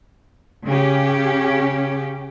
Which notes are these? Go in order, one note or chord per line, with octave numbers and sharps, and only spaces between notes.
C#3 C#4 G4